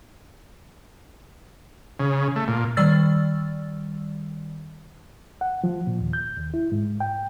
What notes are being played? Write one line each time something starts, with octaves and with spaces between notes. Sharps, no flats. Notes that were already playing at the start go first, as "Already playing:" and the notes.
C#3
A3
A#2
D#3 G3 D5 E6 A6
F#5
F3
A#2
D#2
G6
D#2
E4
G#2
G5